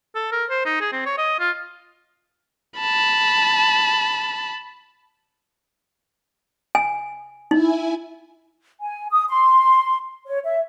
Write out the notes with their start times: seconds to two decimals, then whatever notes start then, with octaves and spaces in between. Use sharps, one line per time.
0.15 A4
0.32 A#4
0.50 C5
0.65 D#4
0.81 G#4
0.92 C4
1.06 C#5
1.18 D#5
1.40 F4
2.80 A5 B5
6.75 G#5
7.51 D#4 E4 G#5
8.81 G#5
9.11 D#6
9.29 C6
10.26 C#5
10.45 E5